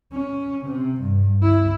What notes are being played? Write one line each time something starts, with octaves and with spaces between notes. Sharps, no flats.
C#4
C3
G2
E4